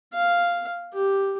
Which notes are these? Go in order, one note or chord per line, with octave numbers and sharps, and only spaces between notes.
F5
G4